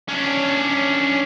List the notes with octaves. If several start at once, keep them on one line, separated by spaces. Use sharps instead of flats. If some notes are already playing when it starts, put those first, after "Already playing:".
C#4 D4